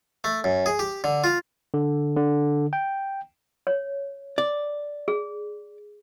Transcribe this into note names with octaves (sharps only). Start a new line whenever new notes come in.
A3
F#2
G#4
G4
D3
F4
D3
D3
G5
C#5
D5
G#4